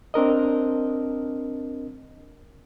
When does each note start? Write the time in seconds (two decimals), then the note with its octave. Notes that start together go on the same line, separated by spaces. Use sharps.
0.14 C4 D4 A#4 D#5